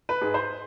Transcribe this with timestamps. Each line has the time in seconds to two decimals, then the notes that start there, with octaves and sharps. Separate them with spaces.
0.09 B4
0.21 G#2 G#3
0.34 C5